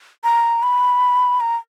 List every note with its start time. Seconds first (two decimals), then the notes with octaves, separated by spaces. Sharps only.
0.24 A#5
0.63 B5
1.40 A#5